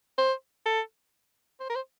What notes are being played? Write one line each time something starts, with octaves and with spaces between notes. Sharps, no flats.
C5
A4
C5
A#4
C5